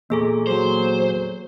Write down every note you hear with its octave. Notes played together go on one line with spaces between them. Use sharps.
E2 A#2 A#3 G#4 A4
F#3 C5